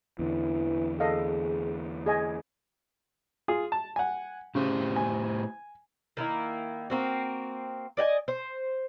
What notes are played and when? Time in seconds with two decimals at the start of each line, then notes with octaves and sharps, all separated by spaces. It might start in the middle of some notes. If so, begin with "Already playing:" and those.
0.19 E2 D3 E3
1.00 G#4 A4 D#5 F5
2.06 G#4 D#5 G#5
3.48 F4 G#4
3.72 A5
3.96 F#5 G#5
4.55 A2 C#3 G4 C5
4.96 G#5
6.17 D#3 A#3 E4
6.90 A#3 C4 F#4
7.97 D5 D#5 F#5 G#5
8.28 C5